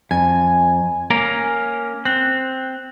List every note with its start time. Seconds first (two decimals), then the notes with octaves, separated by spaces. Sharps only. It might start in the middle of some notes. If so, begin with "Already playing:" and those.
0.11 F2 G#5
1.10 A#3 C#4 A#4
2.05 C4 F#6